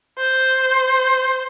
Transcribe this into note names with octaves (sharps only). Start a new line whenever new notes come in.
C5